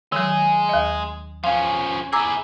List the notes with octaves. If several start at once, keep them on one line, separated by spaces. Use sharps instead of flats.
D#3 F#3 G#3 G#4
D#2 D#5
F3 C#4 F5
E4 G#4 A#5 D6 E6